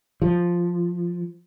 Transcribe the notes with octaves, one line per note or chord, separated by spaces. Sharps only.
F3